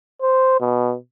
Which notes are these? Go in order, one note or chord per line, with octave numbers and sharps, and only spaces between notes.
C5
B2